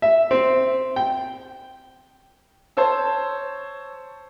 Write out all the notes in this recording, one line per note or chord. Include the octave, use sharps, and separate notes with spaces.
E5
C4
G5
C5 C#5 A5 E6